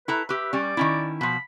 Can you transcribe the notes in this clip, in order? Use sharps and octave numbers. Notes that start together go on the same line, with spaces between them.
E4 A4 B4 A#5
G4 B4 E5
G3 C#4 D5
D#3 C#4 E4
B2 F3 B5